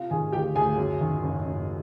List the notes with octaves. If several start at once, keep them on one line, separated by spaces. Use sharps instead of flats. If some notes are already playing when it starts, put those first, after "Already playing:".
Already playing: C3 F4 F5
D#3 G#4 G#5
D2 G4 G5
D2 G#4 G#5
F#2
D#3
F#1
F#1